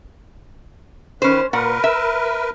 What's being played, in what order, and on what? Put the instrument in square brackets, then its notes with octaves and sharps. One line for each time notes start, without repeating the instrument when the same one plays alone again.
[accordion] D#3 B4 [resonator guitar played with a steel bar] C#4 C5
[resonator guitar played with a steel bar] A#2 F#5 [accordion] A#4 B4
[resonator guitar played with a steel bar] E5